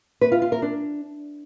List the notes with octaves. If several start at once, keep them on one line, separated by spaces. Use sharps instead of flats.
B4
F4
F4
A#4
D4